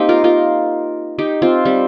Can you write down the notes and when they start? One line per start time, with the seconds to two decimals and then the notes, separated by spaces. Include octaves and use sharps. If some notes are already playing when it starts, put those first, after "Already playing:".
Already playing: A#3 C4 D#4 G4
0.09 F4 A#4
0.24 F4 A#4
1.19 D#4 G4
1.42 C4 F4
1.65 G3 C4